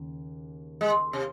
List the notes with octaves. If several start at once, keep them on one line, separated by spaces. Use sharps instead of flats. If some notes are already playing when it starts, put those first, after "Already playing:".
Already playing: D#2 C#3
G#3
C3